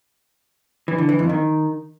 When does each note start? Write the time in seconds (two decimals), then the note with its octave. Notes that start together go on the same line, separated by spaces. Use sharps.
0.88 E3
0.98 D3
1.09 E3
1.19 F2
1.29 D#3